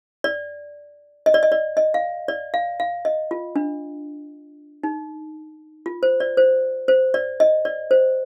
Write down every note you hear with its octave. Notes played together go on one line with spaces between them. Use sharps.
D5
D#5
D5
D#5
D5
D#5
F5
D5
F5
F5
D#5
F4
D4
D#4
F4
C5
D5
C5
C5
D5
D#5
D5
C5